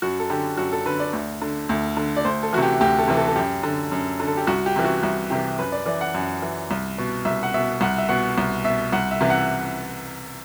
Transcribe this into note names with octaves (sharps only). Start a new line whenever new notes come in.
F#2 F#4
A4
D3 G4
F#2 F#4
A4
D3 B4
D5
D2
D3
D2
D3
D5
D2 C5
A4
C3 E3 F#4 G4
D2 G4
A4
C3 E3
A4
A4
F#2 G4
D3
F#2
D3
A4
G4
C2 F#4
G4
C3 E3
F#4
C2 F#4
C3 E3 G4
F#2 B4
D5
E3 D5
F#5
F#2
E3
C2
B2
C2 E5
F#5
B2 E5
C2 F#5
E5
B2 F#5
C2
B2 E5
C2 F#5
E5
C3 E3
F#5